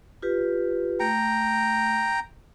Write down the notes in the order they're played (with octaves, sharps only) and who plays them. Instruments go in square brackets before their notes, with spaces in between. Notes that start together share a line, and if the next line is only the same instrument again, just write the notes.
[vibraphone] F4 G4 B4
[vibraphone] A3 [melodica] G5 A#5